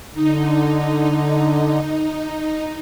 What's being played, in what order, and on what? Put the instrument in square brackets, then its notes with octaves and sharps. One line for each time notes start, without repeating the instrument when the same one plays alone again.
[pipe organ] D3 [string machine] D#4